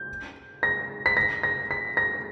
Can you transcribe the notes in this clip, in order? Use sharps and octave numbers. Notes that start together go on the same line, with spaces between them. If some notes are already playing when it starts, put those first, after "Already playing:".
Already playing: G6
A#6
B6
A#6
A#6
B6
A#6